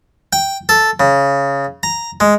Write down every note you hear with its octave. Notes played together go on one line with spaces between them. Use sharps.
G5
A4
C#3
A#5
G#3